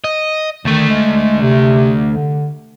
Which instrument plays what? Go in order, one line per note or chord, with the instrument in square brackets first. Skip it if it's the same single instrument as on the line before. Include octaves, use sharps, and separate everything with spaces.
[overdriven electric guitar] D#5
[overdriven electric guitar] D2 A3 [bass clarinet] D#3
[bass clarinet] G#3
C3
D3